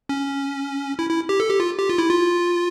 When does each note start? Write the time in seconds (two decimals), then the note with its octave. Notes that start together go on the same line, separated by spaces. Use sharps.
0.09 C#4
0.99 E4
1.10 E4
1.29 G4
1.40 A4
1.49 G4
1.60 F4
1.79 G4
1.89 F4
1.98 E4
2.09 F4